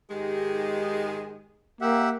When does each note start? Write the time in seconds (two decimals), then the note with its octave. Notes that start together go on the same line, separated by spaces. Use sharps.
0.11 G#2 D#3 G#3 G4
1.81 A#3 G4 E5 F#5